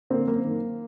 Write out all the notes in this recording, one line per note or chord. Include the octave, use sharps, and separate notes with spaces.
D3 A#3 C4
F#2 A#3
D#3